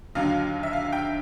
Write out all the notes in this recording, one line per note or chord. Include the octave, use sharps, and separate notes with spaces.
D#2 D3 F#3 F5
E5
F5
G5